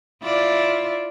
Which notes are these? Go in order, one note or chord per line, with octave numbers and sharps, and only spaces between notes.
E4 F4 D5